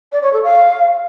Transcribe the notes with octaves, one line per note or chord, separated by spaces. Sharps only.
D5
C#5
A4
F5